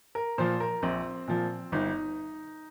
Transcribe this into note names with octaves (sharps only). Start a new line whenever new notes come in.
A#4
A#2 F3 C5
A#4
A#1 C4
A#2 F3
G1 D#4